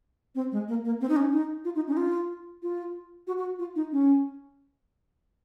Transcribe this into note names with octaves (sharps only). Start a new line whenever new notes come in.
C4
G#3
A#3
A#3
C4
D#4
C#4
D#4
F4
D#4
C#4
D#4
F4
F4
F#4
F#4
F4
D#4
C#4